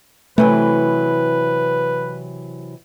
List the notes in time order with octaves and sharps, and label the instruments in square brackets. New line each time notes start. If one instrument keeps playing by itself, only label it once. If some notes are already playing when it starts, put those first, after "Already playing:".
[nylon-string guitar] C3 E3 F#3 [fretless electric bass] A3 [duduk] B4